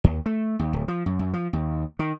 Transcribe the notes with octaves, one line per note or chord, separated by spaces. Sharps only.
D#2
A3
D#2
D1
F3
F#2
F#2
F3
D#2
D#3